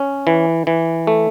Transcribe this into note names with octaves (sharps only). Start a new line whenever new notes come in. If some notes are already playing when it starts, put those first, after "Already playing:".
Already playing: C#4
E3
E3
A3